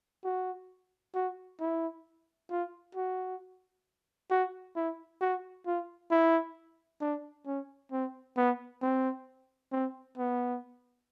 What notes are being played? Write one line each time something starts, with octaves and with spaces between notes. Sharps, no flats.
F#4
F#4
E4
F4
F#4
F#4
E4
F#4
F4
E4
D4
C#4
C4
B3
C4
C4
B3